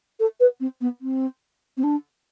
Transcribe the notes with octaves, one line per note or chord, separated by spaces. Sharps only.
A4
B4
C4
B3
C4
C4
D4